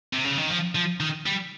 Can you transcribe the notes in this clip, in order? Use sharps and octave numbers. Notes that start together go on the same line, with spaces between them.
C3
C#3
D#3
F3
F3
D#3
G3